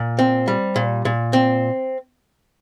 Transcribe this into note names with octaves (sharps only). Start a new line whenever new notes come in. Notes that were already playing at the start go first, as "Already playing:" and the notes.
Already playing: A#2
C4
G3
A#2
A#2
C4